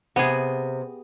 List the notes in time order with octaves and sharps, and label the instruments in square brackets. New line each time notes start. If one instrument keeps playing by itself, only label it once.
[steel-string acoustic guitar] C3 [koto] B3 G#4